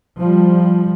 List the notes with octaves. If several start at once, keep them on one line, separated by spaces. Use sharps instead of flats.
F3 G3